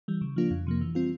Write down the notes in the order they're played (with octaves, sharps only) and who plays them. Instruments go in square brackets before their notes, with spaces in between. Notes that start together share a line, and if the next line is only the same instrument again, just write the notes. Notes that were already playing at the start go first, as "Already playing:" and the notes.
[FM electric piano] E3 G3
C#3
F3 A#3 D4 F4
F2
C3 F3 A#3
E3
G3 C4 F4